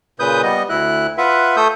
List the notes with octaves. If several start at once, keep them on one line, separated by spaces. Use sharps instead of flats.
A#2 C#3 B4 D#6 G6
G3 B3 D#5
D2 E4 F#6
F4 B4 E5 F#5
A3 A4 D#6 E6 G6